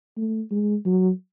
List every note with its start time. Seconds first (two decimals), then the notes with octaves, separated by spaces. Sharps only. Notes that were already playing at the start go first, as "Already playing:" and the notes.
0.17 A3
0.51 G#3
0.86 F#3